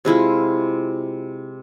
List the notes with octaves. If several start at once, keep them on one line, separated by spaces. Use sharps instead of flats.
C3 G#3 E4 F4